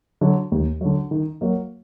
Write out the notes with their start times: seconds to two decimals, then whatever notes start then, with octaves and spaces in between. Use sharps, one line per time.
0.21 D3 F#3
0.52 D#2
0.81 D3 F#3
1.11 D#3
1.41 F#3 A#3